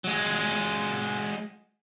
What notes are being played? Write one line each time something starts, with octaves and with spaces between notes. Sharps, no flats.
F#3 G#3